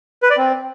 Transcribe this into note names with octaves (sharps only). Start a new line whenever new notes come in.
B4
D5
C4